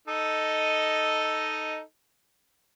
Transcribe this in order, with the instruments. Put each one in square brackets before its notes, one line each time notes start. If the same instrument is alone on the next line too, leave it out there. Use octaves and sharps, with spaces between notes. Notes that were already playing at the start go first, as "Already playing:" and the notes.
[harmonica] D#4 A4 D#5